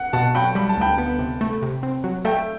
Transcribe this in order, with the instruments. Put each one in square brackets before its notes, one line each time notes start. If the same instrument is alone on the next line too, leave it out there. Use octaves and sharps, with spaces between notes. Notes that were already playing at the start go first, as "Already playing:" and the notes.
Already playing: [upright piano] F#5
[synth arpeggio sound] B2 [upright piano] F#5 A5
[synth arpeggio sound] F#3 [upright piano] G5 B5
[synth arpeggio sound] G3 [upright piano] B5
[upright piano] A5
[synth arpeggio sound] D2 [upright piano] G5 B5
[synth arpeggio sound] B3
C3
A3
C3
C4
F#3
[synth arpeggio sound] A3 [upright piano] E5 G5